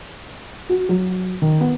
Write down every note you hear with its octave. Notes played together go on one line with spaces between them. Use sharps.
F#4
F#3
D#3
B3